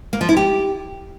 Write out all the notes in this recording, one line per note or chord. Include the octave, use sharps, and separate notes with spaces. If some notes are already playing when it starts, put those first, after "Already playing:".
A#3
F3
E4
G4